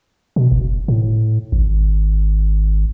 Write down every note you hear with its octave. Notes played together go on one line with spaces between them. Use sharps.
B2
F#1
A2
G#1